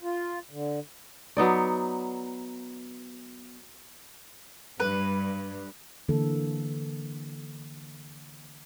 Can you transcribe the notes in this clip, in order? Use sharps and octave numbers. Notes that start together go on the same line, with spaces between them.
F4
D3
F#3 B3 D#4 D5
G2 B4
D3 E3 A#3 A4